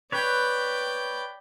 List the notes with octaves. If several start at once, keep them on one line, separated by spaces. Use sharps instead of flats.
B4 C#5 D5 G5